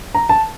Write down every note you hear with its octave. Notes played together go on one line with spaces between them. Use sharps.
A#5
A5